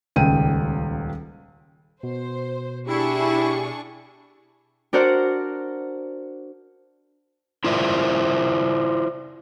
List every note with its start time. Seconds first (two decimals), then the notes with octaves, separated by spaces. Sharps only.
0.16 D#1 C#2 G5 D#7
2.03 B2 C5
2.89 D4 E4 G4 G#4 C#6
4.93 D4 F#4 A#4 C5 D5 F#5
7.64 E4 F4 A#4 C5 D5 E5